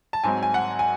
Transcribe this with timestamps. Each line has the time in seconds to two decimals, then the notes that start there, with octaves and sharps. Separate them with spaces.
0.13 A5
0.24 G#2 F#3 C4 G#5
0.43 G#5
0.54 F#5
0.79 G#5